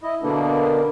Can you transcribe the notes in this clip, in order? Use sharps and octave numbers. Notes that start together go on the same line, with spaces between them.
E4 D#5
B2 D3 A#3 B3 D4